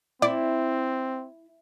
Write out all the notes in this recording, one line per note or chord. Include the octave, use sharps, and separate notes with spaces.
C4 E4 D5